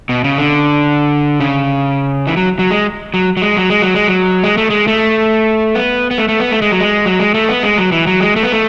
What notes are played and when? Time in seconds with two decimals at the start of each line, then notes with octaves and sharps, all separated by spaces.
0.09 B2
0.24 C#3
0.38 D3
1.40 C#3
2.27 E3
2.37 F#3
2.59 F#3
2.71 G#3
3.14 F#3
3.37 F#3
3.42 G#3
3.57 F#3
3.70 G#3
3.82 F#3
3.95 G#3
4.08 F#3
4.44 G#3
4.57 A3
4.70 G#3
4.88 A3
5.75 B3
6.11 B3
6.18 A3
6.28 A3
6.40 B3
6.51 A3
6.62 G#3
6.71 F#3
6.80 G#3
7.06 F#3
7.19 G#3
7.34 A3
7.49 B3
7.63 G#3
7.78 F#3
7.92 E3
8.07 F#3
8.21 G#3
8.36 A3
8.43 B3
8.52 A3